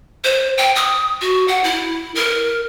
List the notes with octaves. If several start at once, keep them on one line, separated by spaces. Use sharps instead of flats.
C5
G5
D#6
F#4
F#5
E4
A#4